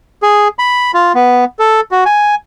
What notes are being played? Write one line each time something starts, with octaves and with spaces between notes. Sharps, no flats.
G#4
B5
F4
B3
A4
F#4
G#5